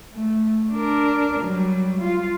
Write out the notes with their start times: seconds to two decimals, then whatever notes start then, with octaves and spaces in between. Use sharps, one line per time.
0.12 A3
0.72 D4 A#4
1.39 F#3 G3
1.99 F4